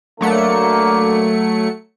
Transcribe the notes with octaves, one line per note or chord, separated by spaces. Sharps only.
D3 F#3 A3 A#3 C#7